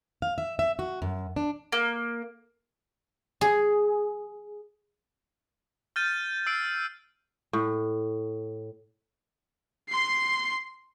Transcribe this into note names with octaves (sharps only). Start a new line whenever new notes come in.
F5
E5
E5
F#4
F#2
D4
A#3
G#4
F6 G6 A6 D#7
E6 C7 D7
A2
C6 C7